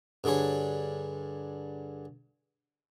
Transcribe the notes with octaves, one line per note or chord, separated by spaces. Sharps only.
G2 D3 G3 G#4 C#5